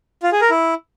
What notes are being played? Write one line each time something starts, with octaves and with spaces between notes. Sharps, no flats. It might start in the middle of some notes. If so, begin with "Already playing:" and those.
F4
G#4
A#4
E4